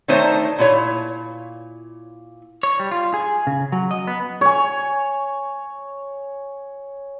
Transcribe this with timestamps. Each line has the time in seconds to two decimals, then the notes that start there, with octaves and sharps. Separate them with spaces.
0.08 D#3 A3 D4 D#4 C5 C#5
0.58 A#2 E4 C#5
2.63 C#5
2.80 G3
2.91 F4
3.14 G#4
3.47 C#3
3.72 F#3
3.91 D#5
4.07 B3
4.41 C#5 G#5